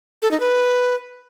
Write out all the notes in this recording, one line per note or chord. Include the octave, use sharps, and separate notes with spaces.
A4
D#4
B4